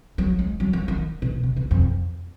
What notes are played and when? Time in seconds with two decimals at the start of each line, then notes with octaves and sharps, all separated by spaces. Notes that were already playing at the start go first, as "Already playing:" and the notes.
0.18 F#3
0.39 G#3
0.60 F#3
0.73 F3
0.88 D#3
1.22 B2
1.43 C#3
1.56 B2
1.71 F2